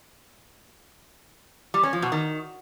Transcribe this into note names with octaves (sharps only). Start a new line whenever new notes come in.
G3
C#4
F3
B2
D#3